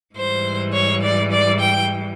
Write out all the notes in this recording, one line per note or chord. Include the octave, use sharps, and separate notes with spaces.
G#2 E3 G3 C5
C#5
D5
D5
G5